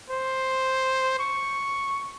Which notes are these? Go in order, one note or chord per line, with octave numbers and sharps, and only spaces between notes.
C5
C#6